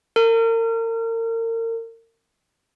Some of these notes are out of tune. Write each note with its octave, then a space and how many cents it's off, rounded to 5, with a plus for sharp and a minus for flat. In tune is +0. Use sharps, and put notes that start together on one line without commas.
A#4 -35